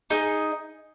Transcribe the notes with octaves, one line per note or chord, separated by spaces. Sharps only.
D#4 G#4 D#5